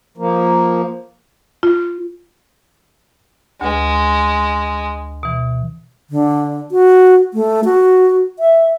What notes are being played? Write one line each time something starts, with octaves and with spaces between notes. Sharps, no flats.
F3 A#3
F4
D2 G#3 B4
B2 E3
D3
F#4
A3
F#4
E5